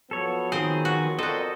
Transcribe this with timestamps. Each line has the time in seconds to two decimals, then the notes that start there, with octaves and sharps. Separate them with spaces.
0.11 F3 F#3 B3 A4 C#5
0.52 D#3 C4 G#4 C5
0.85 F#4
1.19 F2 F#4 A4 A#4 C5 D5 D#5